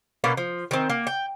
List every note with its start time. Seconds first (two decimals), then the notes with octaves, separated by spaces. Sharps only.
0.24 B2 A#3 C#4 F5
0.37 F3
0.71 D#3 C4
0.90 A#3
1.07 G5